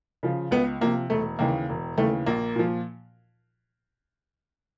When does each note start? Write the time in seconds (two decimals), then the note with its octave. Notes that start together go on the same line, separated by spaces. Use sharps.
0.23 C#3 F3
0.51 C#2 B3
0.81 C3 F3 A#3
1.10 E1 A3
1.39 D#2 C#3 E3 A#3
1.69 E1
1.98 D#2 C#3 E3 A3
2.26 A#1 A#3
2.56 A#2 F3